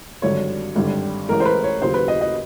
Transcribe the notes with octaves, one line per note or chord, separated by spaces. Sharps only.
G#1 G2 D3 F#3 C#5
G#1 G2 D3 G3
A1 A2 E3 G#3 A#4
C5
B4
C#5
D#2 C#3 F#3 C5
B4
D#5
D#5